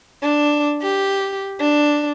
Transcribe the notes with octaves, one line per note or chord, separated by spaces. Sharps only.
D4
G4
D4